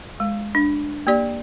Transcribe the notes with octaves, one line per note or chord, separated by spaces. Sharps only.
G#3
D4
A#3 G4 D5